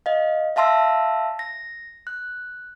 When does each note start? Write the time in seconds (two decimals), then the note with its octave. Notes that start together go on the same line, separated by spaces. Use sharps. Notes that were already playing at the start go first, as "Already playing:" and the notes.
0.06 D#5 F5
0.56 E5 F5 A5 C6 E6 A#6
1.39 A#6
2.07 F#6